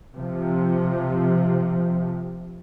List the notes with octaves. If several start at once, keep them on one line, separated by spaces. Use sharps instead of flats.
C3 F3